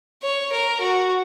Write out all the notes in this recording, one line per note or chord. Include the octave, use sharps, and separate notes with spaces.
C#5
A#4
F#4